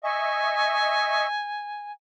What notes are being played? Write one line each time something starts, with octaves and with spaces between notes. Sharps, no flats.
D#5 E5 G#5 C#6